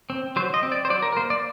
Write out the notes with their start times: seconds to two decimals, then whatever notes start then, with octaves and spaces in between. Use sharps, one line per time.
0.10 C4
0.36 F#3 C5
0.54 D#5
0.63 C4
0.72 D5
0.85 C5
0.90 F#3 D5
1.02 A#4
1.12 A#4
1.17 A#3 C5
1.30 D5